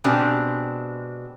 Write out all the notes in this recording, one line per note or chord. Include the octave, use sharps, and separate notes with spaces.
B2 G#3 C4 D4 G4